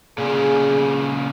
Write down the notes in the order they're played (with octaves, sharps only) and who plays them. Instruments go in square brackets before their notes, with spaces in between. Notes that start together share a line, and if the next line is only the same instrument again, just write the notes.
[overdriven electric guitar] A#2 C#3 [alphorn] G#4